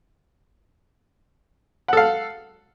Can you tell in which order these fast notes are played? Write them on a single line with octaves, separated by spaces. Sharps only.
F#5 A4 F5